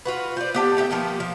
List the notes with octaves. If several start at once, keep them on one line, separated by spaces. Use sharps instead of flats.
F4 F#4 B4
C5 D5
B3 G4 A4
A3 G4 D5 E5
F3 A#3 B3 G4
F3